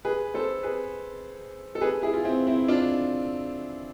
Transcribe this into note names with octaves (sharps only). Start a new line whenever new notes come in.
G#4 B4
A4 C5
G#4 B4
A4
G#4 B4
E4 G#4
F4
C4 E4
C4 E4
D4 F4